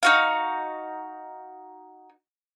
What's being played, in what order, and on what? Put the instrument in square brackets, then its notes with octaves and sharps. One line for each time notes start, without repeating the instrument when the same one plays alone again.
[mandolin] D#4 F#4 F5